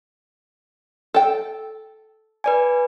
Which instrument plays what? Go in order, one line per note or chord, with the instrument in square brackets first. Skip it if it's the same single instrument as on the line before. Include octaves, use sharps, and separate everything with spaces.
[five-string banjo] A4 G5
[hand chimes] B4 D5 G#5